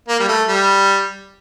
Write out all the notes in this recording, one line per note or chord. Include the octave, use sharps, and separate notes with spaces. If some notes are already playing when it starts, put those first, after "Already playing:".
A#3
G3
A3
G3